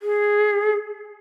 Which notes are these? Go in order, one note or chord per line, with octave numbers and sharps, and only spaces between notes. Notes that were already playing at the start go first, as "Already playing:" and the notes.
G#4